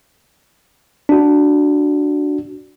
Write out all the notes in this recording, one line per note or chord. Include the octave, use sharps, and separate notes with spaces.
D4 F#4